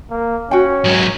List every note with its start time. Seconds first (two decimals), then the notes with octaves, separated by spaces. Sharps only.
0.10 A#3
0.51 C#4 F#4 G5
0.84 G#2 F#3